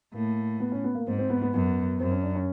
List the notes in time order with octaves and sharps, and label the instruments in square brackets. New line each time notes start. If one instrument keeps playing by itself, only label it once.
[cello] A2 [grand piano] A#3
[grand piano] B3
C#4
B3
A#3
[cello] G#2 [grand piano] C4
[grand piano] C4
B3
B3
[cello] F#2 [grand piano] B3
[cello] F#2 [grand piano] C4
[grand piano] C#4
D4
C#4